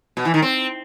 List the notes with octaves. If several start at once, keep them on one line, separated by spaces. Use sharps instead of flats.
B2
E3
D#3
C4